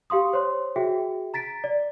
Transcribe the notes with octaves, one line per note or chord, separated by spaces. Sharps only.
G4 F5 C6 D#6
C5 C#5 C6
F#4 G#4 E5 G5
A#5 A6 B6 D7
D5